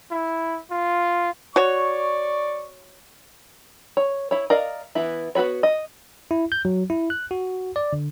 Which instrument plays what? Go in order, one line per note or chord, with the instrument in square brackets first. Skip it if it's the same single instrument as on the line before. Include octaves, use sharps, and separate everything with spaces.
[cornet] E4
F4
[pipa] F#4 C#5 [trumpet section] D5 C#6
[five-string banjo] C#5
E4 C#5
A#4 D5 D#5 F5
E3 B3 E4
B3 F#4 B4 C#5
D#5
[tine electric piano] E4
G6
F#3
E4
F#6
F#4
D5
D3